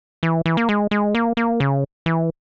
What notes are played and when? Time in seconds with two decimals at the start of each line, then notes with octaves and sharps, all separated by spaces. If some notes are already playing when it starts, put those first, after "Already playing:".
0.23 E3
0.46 E3
0.57 A#3
0.69 G#3
0.91 G#3
1.15 A#3
1.37 A#3
1.60 C#3
2.06 E3